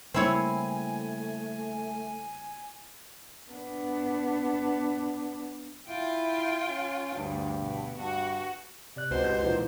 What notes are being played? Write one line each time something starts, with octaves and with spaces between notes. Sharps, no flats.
C#3 G3 A3 A#3 C4 E4 C#5 G#5
B3 D4
E4 F4 G5
C#4
D2 G2
B2
G2 F#4
C3 D5 F#6
C#2 B2 C4 C5
G4 G6
B1 A#2 E3 B3 D#4